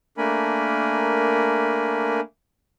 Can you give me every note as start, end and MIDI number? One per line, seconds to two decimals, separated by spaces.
0.18 2.20 57
0.18 2.20 58
0.18 2.20 62
0.18 2.20 70
0.18 2.20 80
0.18 2.20 83